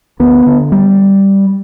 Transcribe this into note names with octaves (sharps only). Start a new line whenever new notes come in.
D2 B3
D3
G3